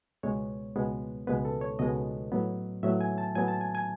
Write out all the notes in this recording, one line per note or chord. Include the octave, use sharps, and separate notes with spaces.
C#2 B2 G#3 B3 C#5
C#2 B2 G#3 B3
C#2 B2 G#3 B3 B4
A4
C#5
C#2 B2 G#3 B3 D#5
A2 F#3 B3
A2 F#3 B3 E5
G#5
A5
A2 F#3 B3 G#5
A5
G#5
G#5